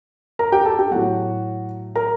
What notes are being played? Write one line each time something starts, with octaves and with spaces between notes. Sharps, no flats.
A#4 A#5
G4 G5
A4 A5
G4 G5
A2 F#3 F#4 F#5
A#4 A#5